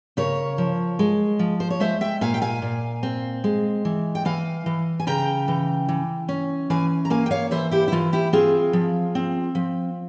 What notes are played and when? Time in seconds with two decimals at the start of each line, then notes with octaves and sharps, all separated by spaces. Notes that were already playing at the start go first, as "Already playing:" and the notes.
0.17 C#3 A#4 C#5
0.58 F3
0.99 G#3
1.39 F3
1.60 C5
1.70 C#5
1.80 G#3 C5 E5
2.01 E5 G5
2.21 A#2 F5 G#5
2.34 G5
2.42 F5 G#5
2.62 A#2
3.03 C4
3.44 G#3
3.85 E3
4.15 G5
4.25 E3 F5 G#5
4.66 E3
5.00 G#5
5.07 C#3 G5 A#5
5.48 E3
5.89 E3
6.29 C#4
6.70 E3 F5 G#5
7.05 A#5
7.10 A#3 F5 G#5
7.26 G5
7.31 C#5 F5
7.51 E3 C5 E5
7.71 E4 G4
7.88 E4
7.92 E3 F4
8.13 E4 G4
8.33 C4 F4 G#4
8.73 F3
9.15 C4
9.55 F3